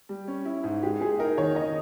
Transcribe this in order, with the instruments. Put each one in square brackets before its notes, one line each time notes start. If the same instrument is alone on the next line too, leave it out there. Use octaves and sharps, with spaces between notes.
[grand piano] G3
C#4
E4
G#2
[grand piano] G#3 [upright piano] G4
[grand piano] G#3 [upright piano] G#4
[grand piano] D#4 [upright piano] A#4
[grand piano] D#3 [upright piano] C#5
[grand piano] D#3 [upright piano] D#5